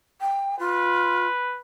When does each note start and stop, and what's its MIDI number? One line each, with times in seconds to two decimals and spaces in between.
0.21 0.57 79
0.59 1.27 65
0.59 1.59 71